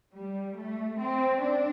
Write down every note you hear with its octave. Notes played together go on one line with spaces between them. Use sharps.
G3
A3
C4
D4